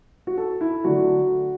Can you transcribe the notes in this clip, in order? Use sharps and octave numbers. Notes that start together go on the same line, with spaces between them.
F#4
A4
E4
D3 F#3 A3 D4 F#4